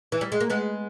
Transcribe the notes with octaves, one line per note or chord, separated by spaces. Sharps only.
E3
G3
G#3
A#3
G#3 B3